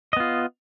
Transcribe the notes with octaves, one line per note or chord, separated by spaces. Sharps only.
B3 F4 D#5